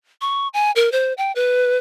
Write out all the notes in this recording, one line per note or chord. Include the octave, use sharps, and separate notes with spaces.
C#6
G#5
A#4
C5
G5
B4